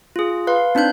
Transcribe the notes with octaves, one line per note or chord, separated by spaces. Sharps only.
F4 G#4
B4 F5 C6
C4 D4 D#4 F#6 G6